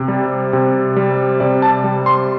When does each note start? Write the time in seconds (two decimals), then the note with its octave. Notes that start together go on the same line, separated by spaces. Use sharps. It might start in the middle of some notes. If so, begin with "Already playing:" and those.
Already playing: C3
0.08 G3
0.53 C3
0.96 G3
1.40 C3 D5
1.62 A5
1.84 G3
2.06 C6